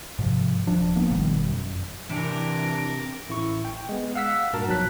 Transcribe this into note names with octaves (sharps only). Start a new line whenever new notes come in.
G#2 C3 F3
D1 F3 D4
F3 A#3 B3
G1 B2 D#3 G3
F#2
C3 E3 D4 A#4 D6
A1 E4 C#6
G5
G#3 B3
F5 F#5 E6 F6 B6
G2 A#2 F#4 A#4 A5
B1 E2 F3 F#3 F#6 B6